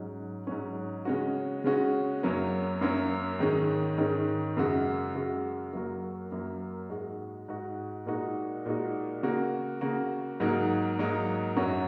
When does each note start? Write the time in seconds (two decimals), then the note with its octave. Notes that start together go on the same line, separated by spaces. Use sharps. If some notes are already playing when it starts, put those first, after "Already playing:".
Already playing: G#2 F#3 C#4
0.47 G#2 F#3 C#4
1.05 C#3 G#3 C#4 F#4
1.64 C#3 G#3 C#4 F#4
2.23 F#2 F#3 A#3 C#4
2.81 F#2 F#3 A#3 C#4
3.39 G#2 D#3 G#3 C#4
3.98 G#2 D#3 G#3 C#4
4.57 F#2 C#3 G#3 F#4
5.15 F#2 C#3 G#3 F#4
5.73 F#2 F#3 A#3 F#4
6.32 F#2 F#3 A#3 F#4
6.89 G#2 G#3 F#4
7.48 G#2 G#3 F#4
8.06 A#2 G#3 D#4 F#4
8.66 A#2 G#3 D#4 F#4
9.23 C#3 A#3 F#4
9.81 C#3 A#3 F#4
10.40 G#2 F#3 A#3 D#4 F#4
10.99 G#2 F#3 A#3 D#4 F#4
11.57 F#2 F#3 C#4 F#4